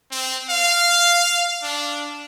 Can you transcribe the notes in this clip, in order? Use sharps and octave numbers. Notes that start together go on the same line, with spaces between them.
C4
F5
D4